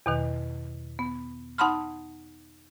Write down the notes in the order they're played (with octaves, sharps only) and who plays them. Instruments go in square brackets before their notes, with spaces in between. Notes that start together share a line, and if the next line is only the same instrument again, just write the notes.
[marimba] E2 B2 D#3
B3
D#4 F#5 A5 B5 C6 F6